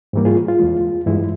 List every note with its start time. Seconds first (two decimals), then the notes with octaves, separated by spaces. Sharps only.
0.13 G#2 E3 G3 A#3
0.25 F4 G#4
0.48 F4
0.59 E2 E3 G#3
1.06 G2 E3 G#3 E4